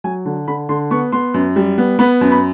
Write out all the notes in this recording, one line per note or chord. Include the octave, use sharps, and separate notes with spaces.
F#3 G#5
D3
D3 B5
D3 C6
B3 C#6
B3 C6
F#2
G3
B3
B3 B5
F#2
B5